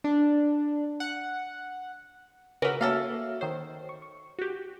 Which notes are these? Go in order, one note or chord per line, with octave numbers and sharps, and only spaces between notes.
D4
F#5
C#3 C#4 F#4 A#4 B4 D6 E6
A#3 C#4 F#4 A4 E5 F5
D#3 C5 C#5
C#6
C#6
F#4 G4